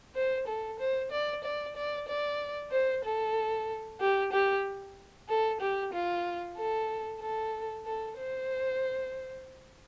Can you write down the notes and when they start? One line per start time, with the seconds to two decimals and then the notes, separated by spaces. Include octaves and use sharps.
0.15 C5
0.47 A4
0.79 C5
1.11 D5
1.44 D5
1.76 D5
2.08 D5
2.71 C5
3.04 A4
4.00 G4
4.32 G4
5.29 A4
5.61 G4
5.93 F4
6.57 A4
7.21 A4
7.85 A4
8.17 C5